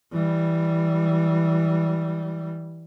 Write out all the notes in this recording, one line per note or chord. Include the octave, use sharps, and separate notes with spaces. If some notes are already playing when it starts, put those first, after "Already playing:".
E3 G3